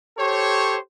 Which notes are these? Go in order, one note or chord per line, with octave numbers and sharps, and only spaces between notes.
G4 A4 C5 C#5